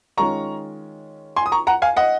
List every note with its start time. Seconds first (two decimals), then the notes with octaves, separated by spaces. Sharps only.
0.17 D#3 G#3 C#4 F4 A#5 C#6
1.36 G#5 C6
1.46 D#6
1.52 A#5 C#6
1.67 F#5 A#5
1.82 F5 G#5
1.97 D#5 F#5